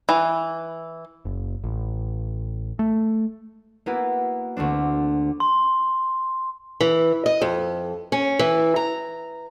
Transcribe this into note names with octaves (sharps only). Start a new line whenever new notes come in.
E3
F#1
A1
A3
A#3 B3 E4 F#4 B4
D2 A3 C4 D4
C6
E3
D#5
F2
C#4
E3
A#5